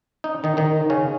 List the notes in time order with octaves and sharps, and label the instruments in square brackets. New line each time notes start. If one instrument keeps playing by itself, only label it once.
[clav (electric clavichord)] D#4
D#3 D#4
D#3 D#4
C#3 C#4